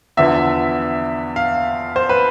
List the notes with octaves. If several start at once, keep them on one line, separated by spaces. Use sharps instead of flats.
E2 D3 F3 B3 E5
F5
C5
B4